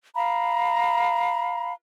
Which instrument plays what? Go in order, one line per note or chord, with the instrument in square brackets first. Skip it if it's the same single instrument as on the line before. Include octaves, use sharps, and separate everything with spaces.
[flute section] F5 A#5 B5